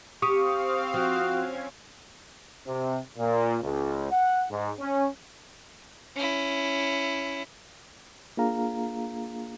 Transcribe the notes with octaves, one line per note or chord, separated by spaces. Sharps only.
C4 G4 F5 C#6 D#6
F3 F#4
C#4 G#6
C3
A#2
C#2
F#5
G#2
C#4
C#4 E4
A#3 D4 F4 G#4 F5 A#5